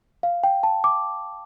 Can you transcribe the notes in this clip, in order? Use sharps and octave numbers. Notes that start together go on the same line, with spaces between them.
F5
G5
A5
D6